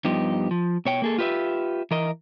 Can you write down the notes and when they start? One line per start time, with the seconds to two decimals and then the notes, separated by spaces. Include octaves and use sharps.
0.04 G2 F3 B3 D#4 G4
0.51 F3
0.85 B2 C#5 G5
1.02 A#3 G#4 A4
1.18 F4 G4 B4 D#5 E5
1.91 E3 A#4 D#5